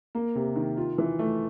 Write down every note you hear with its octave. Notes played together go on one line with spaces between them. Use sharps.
A#3
C3
D#3
F4
E3
A3